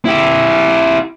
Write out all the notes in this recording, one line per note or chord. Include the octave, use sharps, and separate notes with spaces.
E4 G4